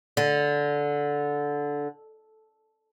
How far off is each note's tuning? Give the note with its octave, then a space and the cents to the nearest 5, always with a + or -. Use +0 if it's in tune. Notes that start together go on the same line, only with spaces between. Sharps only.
D3 -10